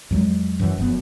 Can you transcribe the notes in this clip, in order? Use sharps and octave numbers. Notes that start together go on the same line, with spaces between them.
F2 F#3 G#3
F#2 E3
F1 F#2 B3